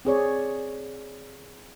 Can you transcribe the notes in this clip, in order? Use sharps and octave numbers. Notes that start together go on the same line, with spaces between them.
C4 G#4 C#5 D5